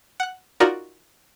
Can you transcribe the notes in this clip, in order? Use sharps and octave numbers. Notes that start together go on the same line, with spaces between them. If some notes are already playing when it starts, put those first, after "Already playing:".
F#5 F#6
D#4 F4 F#4 A#4 D5 A#5